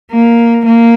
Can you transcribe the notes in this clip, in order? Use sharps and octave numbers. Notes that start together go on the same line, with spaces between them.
A#3
A#3